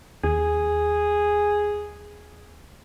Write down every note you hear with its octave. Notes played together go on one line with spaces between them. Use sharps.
D#2 G#4